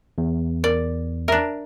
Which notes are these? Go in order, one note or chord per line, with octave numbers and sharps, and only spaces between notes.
E2
A#4 D5
D4 A#4 E5